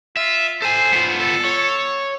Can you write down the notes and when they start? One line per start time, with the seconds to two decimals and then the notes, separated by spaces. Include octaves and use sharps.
0.17 F4 E5
0.62 A4 C5 G#5
0.93 B3 F4
1.18 A4
1.45 C#5